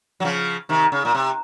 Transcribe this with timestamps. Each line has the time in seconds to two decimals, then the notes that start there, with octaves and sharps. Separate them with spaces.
0.20 F#3
0.24 C#3 F3
0.69 C3 D#3
0.92 C#3
1.05 A#2
1.15 C3